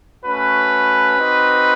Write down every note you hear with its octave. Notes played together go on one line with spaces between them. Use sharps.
A3 C#4 F#4 B4
C4 D#4 F#4